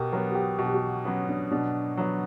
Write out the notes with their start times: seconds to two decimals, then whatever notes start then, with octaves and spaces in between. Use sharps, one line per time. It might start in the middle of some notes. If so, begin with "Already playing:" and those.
Already playing: B2 G4 A#4
0.12 F#3 A#4
0.15 B3
0.31 F#4
0.35 G4
0.59 B2 F#4
0.66 G4
0.74 F#4
1.05 F#3 B3 C#4
1.29 D4
1.52 B2 D4
1.97 F#3 B3